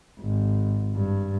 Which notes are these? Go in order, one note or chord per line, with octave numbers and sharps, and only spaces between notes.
G#1
G2